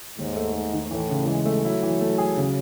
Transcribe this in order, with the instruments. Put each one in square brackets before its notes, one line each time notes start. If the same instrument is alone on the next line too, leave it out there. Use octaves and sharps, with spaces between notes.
[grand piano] D#2 [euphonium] G#2
[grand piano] A3
A3
D#3
[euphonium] A2 [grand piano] E3
[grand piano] C#3
[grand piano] E3 [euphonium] G#3
[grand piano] A3
[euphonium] F#3 [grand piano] E4
[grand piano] E3
A3
G#4
C#3